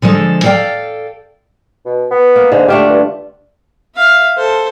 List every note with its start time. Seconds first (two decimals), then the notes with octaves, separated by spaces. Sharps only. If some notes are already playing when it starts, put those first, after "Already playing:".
0.02 D3 F3 G#3 A4
0.43 A4 D5 F5 G5
1.86 B2
2.11 B3
2.36 A#3
2.52 G#2 D3
2.68 A3 D4 F4 G4
2.90 G2
3.95 E5 F5
4.37 A4 C5